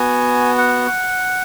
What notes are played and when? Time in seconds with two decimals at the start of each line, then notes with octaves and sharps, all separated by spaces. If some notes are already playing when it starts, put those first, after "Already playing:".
Already playing: B3 F#4 G#5
0.58 F#5